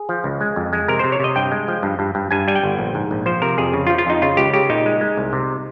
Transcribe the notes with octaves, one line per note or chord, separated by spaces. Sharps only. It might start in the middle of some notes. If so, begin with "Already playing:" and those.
Already playing: G#4
F3
C#2
G#3
F2
G#3
C3 A#4
C3 C5
C#5
C3 D#5
G2 G5
G#3
F3
G2
G2
G2
G2 G#5
G3 G#5
G5
G1
A#1
G#2
A#1
F3 C5
C3 A#4
F2 G#4
C#3
F4
F3
F4
F2 D#4
C#3 F4
C#2 G4
C#3 G4
A#2 D#4
G#3
G#3
C2
C3